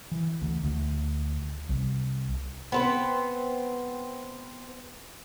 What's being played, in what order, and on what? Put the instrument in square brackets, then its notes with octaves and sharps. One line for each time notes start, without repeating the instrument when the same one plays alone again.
[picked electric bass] E3
D2
D2
C2
[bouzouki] B3 C4 B4